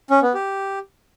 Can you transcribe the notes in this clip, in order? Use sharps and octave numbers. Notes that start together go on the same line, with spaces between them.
C#4
B3
G4